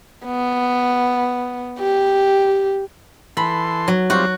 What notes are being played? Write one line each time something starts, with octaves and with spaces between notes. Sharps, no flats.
B3
G4
E3 A4 B5 C6
F#3
G3 C4 F4 F#4